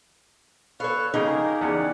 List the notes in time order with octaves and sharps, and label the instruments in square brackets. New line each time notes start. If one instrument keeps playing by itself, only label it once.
[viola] A4 [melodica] B4 C#6 [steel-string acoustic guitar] C#5 F5
[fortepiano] C#3 [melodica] A#3 G4 G#4 [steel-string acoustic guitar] D#4 [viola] A#4
[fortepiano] E2 C#3 [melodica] G3 D5 F#5